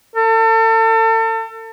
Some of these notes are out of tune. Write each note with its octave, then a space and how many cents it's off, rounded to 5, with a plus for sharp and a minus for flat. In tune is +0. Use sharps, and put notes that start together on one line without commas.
A4 +35